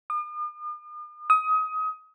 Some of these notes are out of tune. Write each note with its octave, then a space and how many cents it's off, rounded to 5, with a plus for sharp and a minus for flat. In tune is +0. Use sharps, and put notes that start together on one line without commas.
D#6 -45
D#6 +25